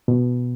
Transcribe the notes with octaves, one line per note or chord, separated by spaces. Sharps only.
B2